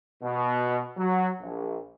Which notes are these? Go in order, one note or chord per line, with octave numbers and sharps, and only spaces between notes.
B2
F#3
A#1